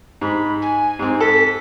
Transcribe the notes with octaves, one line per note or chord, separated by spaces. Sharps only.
G#2 B5
G#5
G#2 C4
A4 B6